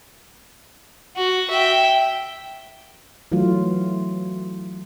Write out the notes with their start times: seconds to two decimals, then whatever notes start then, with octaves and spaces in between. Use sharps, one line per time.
1.16 F#4
1.50 E5 G5
3.32 E3 F#3 A3 F4